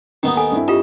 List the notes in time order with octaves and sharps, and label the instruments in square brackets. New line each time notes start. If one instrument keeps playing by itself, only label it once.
[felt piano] D#2 [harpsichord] D#3 B3 D#4
[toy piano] A4 G#5
[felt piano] G2 C4 E4
[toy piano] F4 G4 A#5 [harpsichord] D#5